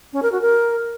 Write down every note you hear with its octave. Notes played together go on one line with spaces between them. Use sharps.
C#4
A#4
F#4
A#4